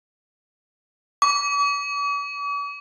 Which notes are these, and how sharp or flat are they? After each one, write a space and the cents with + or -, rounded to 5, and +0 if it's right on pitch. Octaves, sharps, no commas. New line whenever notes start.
D6 -45